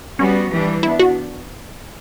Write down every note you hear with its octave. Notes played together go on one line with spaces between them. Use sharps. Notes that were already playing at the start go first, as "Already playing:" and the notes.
G3 B3 C#4 F#4
E3 G3 D4
B3 D4 E4
F#4